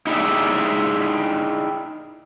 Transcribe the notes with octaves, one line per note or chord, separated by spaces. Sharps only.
D#4 E4 G4 G#4 D5 E5